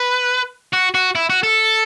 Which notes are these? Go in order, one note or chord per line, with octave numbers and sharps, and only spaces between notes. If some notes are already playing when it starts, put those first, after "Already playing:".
Already playing: B4
F#4
F#4
E4
F#4
A4